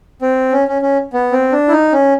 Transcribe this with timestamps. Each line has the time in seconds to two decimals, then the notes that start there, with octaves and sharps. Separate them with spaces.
0.22 C4
0.52 C#4
0.68 C#4
0.82 C#4
1.13 B3
1.32 C4
1.52 D4
1.68 E4
1.72 D#4
1.93 C#4